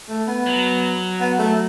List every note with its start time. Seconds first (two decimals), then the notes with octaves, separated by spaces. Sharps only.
0.09 A3
0.28 B3
0.47 F#3
1.20 B3
1.39 A3